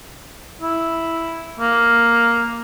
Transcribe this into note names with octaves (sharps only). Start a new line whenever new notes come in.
E4
A#3